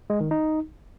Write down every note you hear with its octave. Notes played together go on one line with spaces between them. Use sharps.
G#3
D#3
D#4